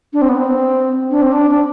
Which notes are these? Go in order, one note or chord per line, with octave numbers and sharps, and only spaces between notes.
D4
C4
B3
C4
D4
C4
D4
D4